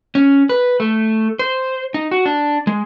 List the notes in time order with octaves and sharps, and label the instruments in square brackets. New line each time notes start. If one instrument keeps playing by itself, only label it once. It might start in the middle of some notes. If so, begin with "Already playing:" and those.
[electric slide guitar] C#4
B4
A3
C5
D#4
F#4
D4
G#3